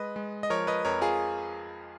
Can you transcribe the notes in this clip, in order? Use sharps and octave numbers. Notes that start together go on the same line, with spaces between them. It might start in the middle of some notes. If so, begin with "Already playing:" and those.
Already playing: G#3 B4 D#5
G#3
D#5
F3 A#4 C#5
B4 D#5
F2 A#4 C#5
F4 G#4